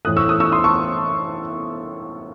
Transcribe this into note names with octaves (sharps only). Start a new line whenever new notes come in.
A2 E3 A3 D#6 F#6
C#6 E6
D#6 F#6
C#6 E6
C6 D#6
A5 C#6